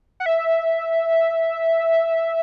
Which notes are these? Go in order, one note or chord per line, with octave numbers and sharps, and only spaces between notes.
F#5
E5